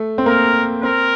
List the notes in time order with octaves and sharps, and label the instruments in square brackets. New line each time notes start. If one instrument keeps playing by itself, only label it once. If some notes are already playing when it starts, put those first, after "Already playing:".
Already playing: [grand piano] A3
C4
[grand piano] A#3 [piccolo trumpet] A#4
[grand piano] C4 [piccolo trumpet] A#4